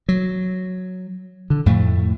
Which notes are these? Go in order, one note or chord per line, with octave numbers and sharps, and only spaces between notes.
F#3
D3
F2 A2 A3